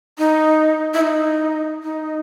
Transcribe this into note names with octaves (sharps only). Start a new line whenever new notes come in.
D#4
E4
D#4
D#4